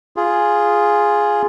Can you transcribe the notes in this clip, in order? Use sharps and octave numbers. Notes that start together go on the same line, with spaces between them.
F4 G#4